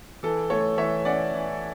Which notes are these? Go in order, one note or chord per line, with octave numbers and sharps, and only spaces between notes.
E3 A4
A3 A4 C#5
E3 C#5 E5
C#4 D5 F#5
E3